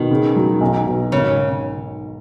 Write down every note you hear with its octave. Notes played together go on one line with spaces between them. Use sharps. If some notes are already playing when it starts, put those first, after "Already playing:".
Already playing: B2 D#3
C#3
F#3
B1
B2
G#1 C#3